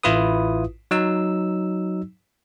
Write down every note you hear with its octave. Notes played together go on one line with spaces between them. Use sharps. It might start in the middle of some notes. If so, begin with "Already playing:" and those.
A1 E4 F4 B4 D#6
F#3 D#4 E6